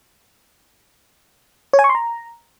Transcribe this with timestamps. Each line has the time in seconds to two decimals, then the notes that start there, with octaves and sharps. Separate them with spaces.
1.73 C#5
1.79 G#5
1.84 C#6
1.89 C6
1.95 A#5